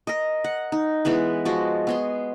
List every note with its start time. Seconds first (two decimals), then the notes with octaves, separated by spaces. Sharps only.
0.07 A#4 D#5
0.44 F#5
0.72 D#4
1.05 E3 G#3 B3 B4
1.45 F3 G#3 F#4
1.87 B3 G#4 C6